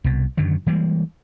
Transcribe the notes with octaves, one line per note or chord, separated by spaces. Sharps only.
C2 B2
F#2 D3 D#3 F#3
E3 G3 G#3 A#3